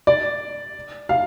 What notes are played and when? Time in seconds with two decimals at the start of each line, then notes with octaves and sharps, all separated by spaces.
0.07 D5
1.09 F5